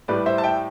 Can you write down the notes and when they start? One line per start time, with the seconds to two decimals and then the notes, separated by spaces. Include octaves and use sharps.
0.08 A2 G3 B4 D5
0.26 C5 E5
0.38 A5
0.43 E5 G5